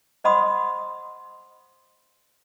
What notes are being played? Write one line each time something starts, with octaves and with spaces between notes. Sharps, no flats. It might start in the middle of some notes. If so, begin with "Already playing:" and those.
C5 D#5 F#5 B5 C6 D#6